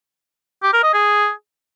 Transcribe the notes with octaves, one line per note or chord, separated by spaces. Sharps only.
G4
A#4
D#5
G#4